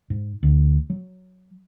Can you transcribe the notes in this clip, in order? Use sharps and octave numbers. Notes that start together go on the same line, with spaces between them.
G#2
D2
F#3